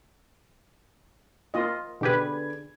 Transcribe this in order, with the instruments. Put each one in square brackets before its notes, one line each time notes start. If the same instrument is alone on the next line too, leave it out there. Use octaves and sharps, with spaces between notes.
[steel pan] A#3 F4 D#5
[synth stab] B2 G4 B4 [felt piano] D3 G#4 G#6